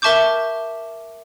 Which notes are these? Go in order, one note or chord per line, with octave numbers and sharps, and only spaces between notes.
A#4 E5 A5 C#6 D6 G6